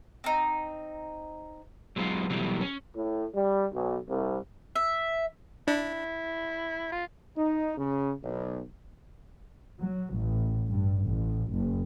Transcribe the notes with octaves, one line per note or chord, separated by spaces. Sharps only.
C4 D#4
F#3 G#3 B3 D#4 F4
B2 E3 F#3 G3 A3
C#4
A2
G3
B1
C2
E5
D4 E4
F4
D#4
C#3
B1
F#3
A1
G2
A1
F#1